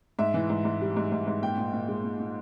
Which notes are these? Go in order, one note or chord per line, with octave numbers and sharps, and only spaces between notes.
G#2 E5
E3
G#2
G#2
G3
G#2
G#2
G#2
A#2 G5
A#2
A#2
G#3
A#2
A#2